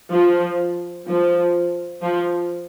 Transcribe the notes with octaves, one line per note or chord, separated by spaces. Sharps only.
F3
F3
F3